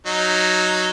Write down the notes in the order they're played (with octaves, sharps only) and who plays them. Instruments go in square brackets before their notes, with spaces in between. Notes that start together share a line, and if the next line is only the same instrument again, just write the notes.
[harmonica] F#3 D#4